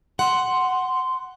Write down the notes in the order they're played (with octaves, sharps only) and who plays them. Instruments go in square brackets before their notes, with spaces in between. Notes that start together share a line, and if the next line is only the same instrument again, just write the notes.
[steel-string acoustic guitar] F#5 [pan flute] C6